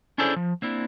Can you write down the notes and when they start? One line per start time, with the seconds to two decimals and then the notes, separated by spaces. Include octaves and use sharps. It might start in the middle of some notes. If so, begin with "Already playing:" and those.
0.18 C#4 D4 E4 G#4 A4 C5
0.36 F3
0.62 A#3 C4 D4 E4